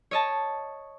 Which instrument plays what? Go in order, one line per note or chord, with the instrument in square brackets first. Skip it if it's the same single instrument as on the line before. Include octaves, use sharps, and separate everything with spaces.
[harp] C#5 D#5 A5